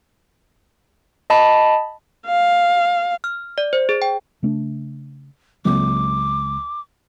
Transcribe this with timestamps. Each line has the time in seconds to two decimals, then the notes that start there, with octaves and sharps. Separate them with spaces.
1.30 D#5 A5 B5
2.27 F5
3.24 F6
3.58 D5
3.73 C5
3.89 G#4
4.02 G5
4.43 C#3 A3 D4
5.65 C#2 F#3 A#3 C4 D6